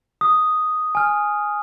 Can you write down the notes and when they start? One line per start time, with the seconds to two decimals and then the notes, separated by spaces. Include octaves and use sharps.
0.21 D#6
0.95 G#5 F6